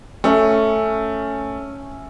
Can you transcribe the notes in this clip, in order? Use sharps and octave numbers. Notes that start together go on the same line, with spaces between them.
A3 C#4 E5